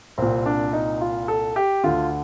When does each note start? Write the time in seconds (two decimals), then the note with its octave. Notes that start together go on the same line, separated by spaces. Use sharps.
0.18 C2 A#2 C4
0.46 D4
0.73 D#4
1.01 F4
1.28 A4
1.56 G4
1.84 D2 D3 F4